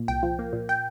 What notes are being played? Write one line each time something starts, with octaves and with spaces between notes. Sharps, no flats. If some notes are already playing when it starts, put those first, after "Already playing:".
Already playing: A#2
C2 G5
F3
A#3
A#2
G5